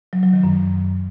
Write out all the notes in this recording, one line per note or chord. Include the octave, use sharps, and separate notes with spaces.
F#3
F#3
D#3
F#2